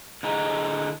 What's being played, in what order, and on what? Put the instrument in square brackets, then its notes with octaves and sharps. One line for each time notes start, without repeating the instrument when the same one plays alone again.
[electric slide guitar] D3 E4 G#4 D#5 A#5